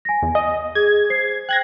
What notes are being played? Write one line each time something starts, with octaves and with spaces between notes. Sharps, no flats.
G#5 A#6
E2
D#5
G#4 G#6
C5 C7
G5 F#6 G#6 A#6